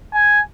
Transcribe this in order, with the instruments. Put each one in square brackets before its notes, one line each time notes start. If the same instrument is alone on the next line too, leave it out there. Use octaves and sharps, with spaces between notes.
[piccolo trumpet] G#5